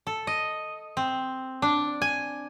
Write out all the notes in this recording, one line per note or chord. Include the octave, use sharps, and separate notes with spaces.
A4
D#5
C4
D4
G#5